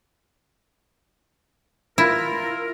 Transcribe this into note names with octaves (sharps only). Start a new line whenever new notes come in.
E4 F4 A#4